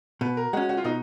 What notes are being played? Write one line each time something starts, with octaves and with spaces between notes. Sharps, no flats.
B2 B4
A#4
G#3 C#4 F#4
F#4
F4
B2 D#4